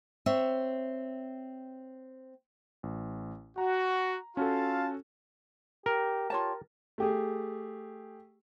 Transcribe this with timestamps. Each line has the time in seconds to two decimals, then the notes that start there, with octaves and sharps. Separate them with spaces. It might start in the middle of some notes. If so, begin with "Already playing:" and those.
0.26 C4 C#5 E5
2.83 A1
3.58 F#4 A#5
4.37 C#4 F4 F#4 A4 F5 A5
5.86 G4 A#4
6.30 F4 G4 C#5 A5
6.98 A3 G4 G#4